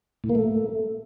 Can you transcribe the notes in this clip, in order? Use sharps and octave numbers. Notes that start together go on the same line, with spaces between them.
A2
A#3
A3